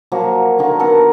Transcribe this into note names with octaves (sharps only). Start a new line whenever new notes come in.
F3 F#3 A#3
D3 D#3 A#3
B3 A4 A#4 F#5